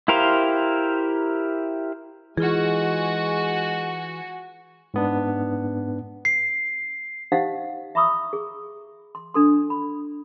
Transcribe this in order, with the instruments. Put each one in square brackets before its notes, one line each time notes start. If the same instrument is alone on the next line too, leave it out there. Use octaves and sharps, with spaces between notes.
[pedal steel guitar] E4 G4 A#4 C5 F5
[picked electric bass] E3 [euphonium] G#3 [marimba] F4 G#4 [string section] F#4 G#5
[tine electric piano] G#2 B3 D4
[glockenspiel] C7
[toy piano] D#4 G4 C5 D#5 F5 F#5
E5 A#5 B5 C#6 D#6 E6
G#4
C6
D4 A4 C6
B5